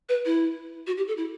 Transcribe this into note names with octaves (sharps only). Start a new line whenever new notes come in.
B4
E4
F#4
G4
A4
E4